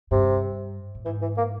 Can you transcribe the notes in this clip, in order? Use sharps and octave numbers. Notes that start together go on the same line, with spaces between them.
G2 C3
A2
G#2 E3
E3
A#3